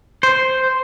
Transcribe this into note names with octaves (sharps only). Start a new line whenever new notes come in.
C5